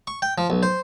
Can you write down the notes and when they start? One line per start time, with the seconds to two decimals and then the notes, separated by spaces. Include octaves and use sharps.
0.07 C#6
0.22 G5
0.38 F3
0.50 B1
0.63 C5